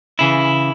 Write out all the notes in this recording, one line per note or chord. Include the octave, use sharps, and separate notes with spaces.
C#3 E3 E4